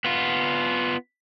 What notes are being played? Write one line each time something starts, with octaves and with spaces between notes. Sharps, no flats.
B3 F4